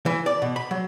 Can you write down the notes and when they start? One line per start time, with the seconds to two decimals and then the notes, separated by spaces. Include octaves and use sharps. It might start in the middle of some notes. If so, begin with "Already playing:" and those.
0.06 E3
0.26 D5
0.42 B2
0.56 B5
0.71 F#3